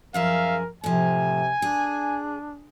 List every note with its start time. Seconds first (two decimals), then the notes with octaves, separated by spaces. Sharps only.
0.14 F#2 F3 G#4 A#4 E5 F5
0.84 A2 C3 F3 G#5
1.62 D4 G#4